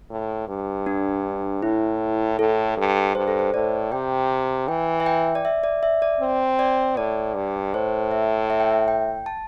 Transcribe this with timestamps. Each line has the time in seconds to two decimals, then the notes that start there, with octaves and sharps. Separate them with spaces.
0.11 A2
0.48 G2
0.86 D4
1.62 A2 E4
2.39 A2 A4
2.77 G2
3.15 G2 C5
3.27 A4
3.39 C5
3.54 A2 D5
3.92 C3 G5
4.68 E3 G5
5.00 E5
5.06 G5
5.35 D5
5.45 E5
5.64 D5
5.83 E5
6.02 D5
6.20 C4
6.59 D5
6.97 A2 D5
7.35 G2
7.74 A2 C5
8.11 E5
8.50 E5
8.60 G5
8.71 E5
8.88 G5
9.26 A5